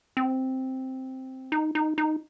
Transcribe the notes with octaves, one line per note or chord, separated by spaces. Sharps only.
C4
D#4
D#4
D#4